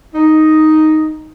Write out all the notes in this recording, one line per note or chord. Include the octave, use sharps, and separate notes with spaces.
D#4